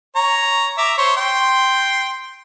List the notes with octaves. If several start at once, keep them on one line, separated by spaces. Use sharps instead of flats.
C#5 A#5
E5 A#5 D6
C5 C#5 C6
G5 C6